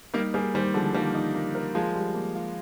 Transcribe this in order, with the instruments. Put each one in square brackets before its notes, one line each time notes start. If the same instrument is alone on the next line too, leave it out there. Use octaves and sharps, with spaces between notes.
[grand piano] G3 A#3 [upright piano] D#4
[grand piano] G3 A#3 [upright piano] G#4
[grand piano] D#3 G3 [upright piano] C5
[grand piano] D3 F3 [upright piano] G#3
[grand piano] D#3 G3 [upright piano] A#3
[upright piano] D#4
A#3
A#4
[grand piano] F3 G#3 [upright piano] F4
[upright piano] G3
A#3
F4